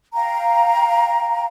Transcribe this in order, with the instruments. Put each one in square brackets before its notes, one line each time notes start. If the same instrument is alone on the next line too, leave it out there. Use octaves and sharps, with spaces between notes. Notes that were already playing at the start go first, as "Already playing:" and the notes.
[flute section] F5 G5 A#5